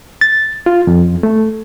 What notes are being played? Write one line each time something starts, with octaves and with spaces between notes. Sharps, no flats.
A6
F4
F2
A3